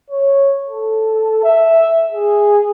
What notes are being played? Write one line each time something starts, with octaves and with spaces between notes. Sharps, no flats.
C#5
A4
E5
G#4